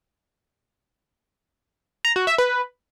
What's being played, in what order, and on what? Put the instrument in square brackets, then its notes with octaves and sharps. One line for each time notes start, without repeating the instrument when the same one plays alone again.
[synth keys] A#5
F#4
E5
B4